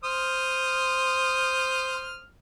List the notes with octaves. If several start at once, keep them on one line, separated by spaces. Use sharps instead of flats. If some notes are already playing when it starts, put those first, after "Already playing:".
C5 D#6 F6